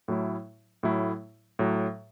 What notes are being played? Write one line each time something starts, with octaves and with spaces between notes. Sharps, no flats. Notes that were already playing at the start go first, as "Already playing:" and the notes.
A2 F#3 A3 E4
A2 F#3 A3 E4
A2 F#3